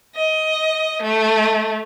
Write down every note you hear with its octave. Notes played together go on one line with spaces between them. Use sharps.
D#5
A3